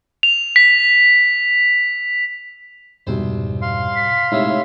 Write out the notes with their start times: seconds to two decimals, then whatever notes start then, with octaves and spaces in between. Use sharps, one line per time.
0.23 F7
0.56 B6
3.07 C2 F2 G#2 B2 C5
3.62 F5 C6
3.96 B6
4.32 A2 C3 G#3 D#4 E4 C#5 E5